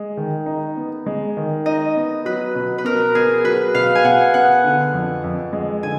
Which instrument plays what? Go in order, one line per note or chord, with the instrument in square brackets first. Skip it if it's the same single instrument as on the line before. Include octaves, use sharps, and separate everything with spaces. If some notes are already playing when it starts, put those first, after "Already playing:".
Already playing: [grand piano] G#3
D#3
D#4
B3
G#3
D#3
[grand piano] D#4 [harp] D#5
[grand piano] B3
[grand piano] F#3 [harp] B4
[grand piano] B2
[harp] B4
[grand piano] B2 [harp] A#4
[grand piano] B3 [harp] G#4
[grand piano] F#3 [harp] B4
[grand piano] B2 [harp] F5
[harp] G#5
[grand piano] B2 [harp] F#5
[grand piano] B3 [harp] F#5
[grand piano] D3
F2
F2
G#3
[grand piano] D3 [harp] G#5